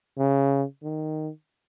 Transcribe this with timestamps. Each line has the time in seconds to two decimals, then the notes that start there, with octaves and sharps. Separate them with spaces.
0.18 C#3
0.83 D#3